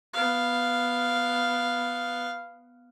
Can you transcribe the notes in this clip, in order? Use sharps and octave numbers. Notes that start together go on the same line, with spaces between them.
B3 F5